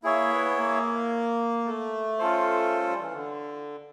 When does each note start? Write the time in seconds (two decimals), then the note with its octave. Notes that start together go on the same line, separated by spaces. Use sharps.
0.03 A#3 E4 G#4 C#5 E5
0.31 B3
0.57 A#3
1.65 A3
2.19 C#4 F4 A4 C5
2.72 G#3
2.86 G3
2.99 E3
3.13 D3